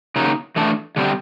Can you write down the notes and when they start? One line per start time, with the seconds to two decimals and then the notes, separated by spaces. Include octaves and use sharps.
0.16 C#3 F#3 A#3 D#4
0.56 E3 A3 D4
0.96 D3 G3 C4